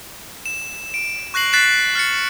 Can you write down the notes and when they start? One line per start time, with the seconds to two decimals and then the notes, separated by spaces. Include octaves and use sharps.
0.46 E7
0.94 D7
1.34 C#6 F#6 A#6 C7 F#7
1.53 F#6 A6 B6 C7 E7
1.95 F6 A6 C#7